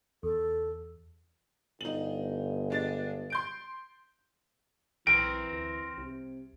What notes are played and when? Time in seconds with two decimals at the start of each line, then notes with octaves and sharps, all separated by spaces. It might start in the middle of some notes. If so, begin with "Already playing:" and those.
0.23 E2 A4
1.81 G1 D#4 F#7
2.70 G#3 D4 A6
3.30 C6 G6 D7
5.07 B1 E3 C4 A#4 D7
5.52 D2
5.98 C2 C3